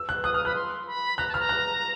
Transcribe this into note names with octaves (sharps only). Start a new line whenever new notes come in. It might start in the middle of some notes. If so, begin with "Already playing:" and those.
Already playing: E6
F#6
D#6 F#6
D#6 F6
B5 F#6
C6
B5
A#5 F#6
A5
B5 F6
A#5
F#6